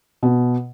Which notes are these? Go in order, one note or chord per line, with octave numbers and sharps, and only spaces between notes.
B2